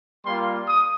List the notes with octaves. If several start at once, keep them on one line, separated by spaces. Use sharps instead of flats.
G3 A#3 F4 C6
D#6